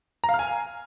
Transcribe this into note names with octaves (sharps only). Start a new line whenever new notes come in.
A#5
F5
F6
G#5